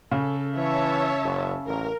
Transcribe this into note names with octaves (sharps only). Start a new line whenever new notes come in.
C#3 A4
E3 C#5 E5 A5
F#1
A1 A#4